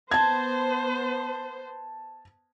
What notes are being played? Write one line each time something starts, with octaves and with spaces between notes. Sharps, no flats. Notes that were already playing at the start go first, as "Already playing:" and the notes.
B3 C5 A5 G#6